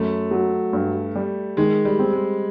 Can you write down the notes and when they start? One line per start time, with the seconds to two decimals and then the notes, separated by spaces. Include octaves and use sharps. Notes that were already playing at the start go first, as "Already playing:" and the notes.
Already playing: F#2 A3
0.31 F#3
0.73 G2
1.15 G3
1.57 D#3 G#3
1.85 G3
1.99 C4
2.13 G#3